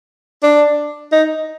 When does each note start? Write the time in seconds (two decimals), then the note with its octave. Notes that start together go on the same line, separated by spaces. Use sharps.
0.43 D4
1.12 D#4